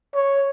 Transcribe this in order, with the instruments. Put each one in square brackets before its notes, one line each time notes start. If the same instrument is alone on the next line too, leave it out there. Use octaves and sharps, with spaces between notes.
[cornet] C#5